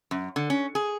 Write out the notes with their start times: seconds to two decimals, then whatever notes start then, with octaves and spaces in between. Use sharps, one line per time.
0.11 F#2
0.36 D3
0.50 C#4
0.75 G#4